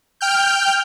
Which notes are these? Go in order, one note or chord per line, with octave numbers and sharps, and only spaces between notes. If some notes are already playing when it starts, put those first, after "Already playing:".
G5 F6 G6